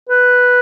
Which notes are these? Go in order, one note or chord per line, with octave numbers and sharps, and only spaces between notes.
B4